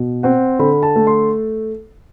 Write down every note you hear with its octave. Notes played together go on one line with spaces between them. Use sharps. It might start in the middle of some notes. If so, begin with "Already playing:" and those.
Already playing: B2
C4 F#5
D3 B5
A5
A3
C6